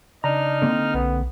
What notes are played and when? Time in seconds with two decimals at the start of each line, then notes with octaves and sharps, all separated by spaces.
0.24 C#3 D4 D#4 A#5 F6
0.62 D3 A#3 C4
0.94 B1 B3